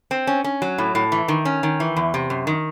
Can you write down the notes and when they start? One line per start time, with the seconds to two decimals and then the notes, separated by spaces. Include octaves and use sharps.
0.11 C4
0.27 C#4
0.44 C#4
0.62 F#3
0.78 A2
0.95 A2
1.12 E3
1.28 D#3
1.45 C#4
1.63 D#3
1.80 E3
1.96 E2
2.14 C3
2.30 F#2
2.47 D#3